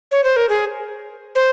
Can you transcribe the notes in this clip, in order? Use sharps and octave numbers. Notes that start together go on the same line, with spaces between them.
C#5
C5
A#4
G#4
C5